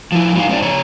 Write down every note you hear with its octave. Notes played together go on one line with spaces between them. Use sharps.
F3 E4
F#3 G#3 D#4 F5
C4 D#4 C5 D5 D#5
C#3 C#5 A#5